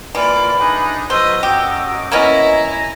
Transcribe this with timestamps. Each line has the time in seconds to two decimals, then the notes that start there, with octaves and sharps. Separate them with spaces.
0.15 E3 A#3 F4 A#4 D5 B5
0.59 D4 D#4 G#4
1.10 F#3 F4 B4 C5 D#5 E6
1.43 F#2 F#4 G4 D#5 D6
2.12 A#3 B3 C#4 E4 D#5 G#5 A#5 A#6